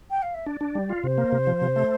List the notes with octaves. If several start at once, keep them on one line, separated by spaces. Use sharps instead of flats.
G5
F5
E5
D4 D5
D4
G3
F4
C3 C5
A#3
C3
F3
C3
A3